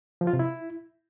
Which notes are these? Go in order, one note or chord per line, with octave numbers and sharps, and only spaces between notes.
F3
F4
C3
E4